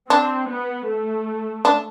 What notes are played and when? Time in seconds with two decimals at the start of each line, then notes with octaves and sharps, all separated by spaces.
0.10 C4 D4
0.49 B3
0.87 A3
1.65 D4